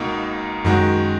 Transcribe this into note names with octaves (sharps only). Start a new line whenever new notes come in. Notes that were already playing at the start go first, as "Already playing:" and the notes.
Already playing: C#2 B2 A#3 D#4
F#2 D#3 G#3 D#4 F#4